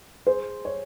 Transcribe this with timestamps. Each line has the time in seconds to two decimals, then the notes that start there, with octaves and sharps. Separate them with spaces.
0.26 G#4 C5
0.65 C#5